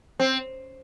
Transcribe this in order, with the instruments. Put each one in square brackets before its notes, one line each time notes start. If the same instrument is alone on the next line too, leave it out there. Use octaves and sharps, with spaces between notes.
[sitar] C4